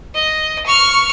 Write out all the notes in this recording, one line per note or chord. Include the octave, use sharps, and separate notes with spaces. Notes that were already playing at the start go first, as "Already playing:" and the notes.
D#5
C#6 F6